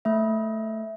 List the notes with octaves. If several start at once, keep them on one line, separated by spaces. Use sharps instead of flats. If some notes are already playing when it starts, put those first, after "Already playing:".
A3 E5